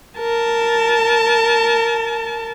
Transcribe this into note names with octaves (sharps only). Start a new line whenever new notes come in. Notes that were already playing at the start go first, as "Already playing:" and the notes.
A#4 A5